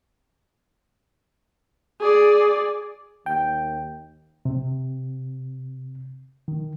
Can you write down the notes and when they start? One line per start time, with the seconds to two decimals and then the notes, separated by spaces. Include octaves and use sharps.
2.01 G#4 D5
3.26 D#2 G5
4.45 C3
6.48 D#3